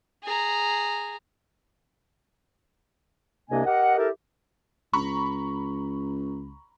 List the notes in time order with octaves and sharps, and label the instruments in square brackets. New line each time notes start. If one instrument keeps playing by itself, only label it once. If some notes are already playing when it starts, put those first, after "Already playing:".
[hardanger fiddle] G#4 A#5
[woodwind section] C2 C3 A#3 D4 D#5 G#5
G4 A#4 D#5 F#5
E4 G4 A4 A#4
[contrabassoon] C#2 [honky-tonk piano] A#5 B5 C#6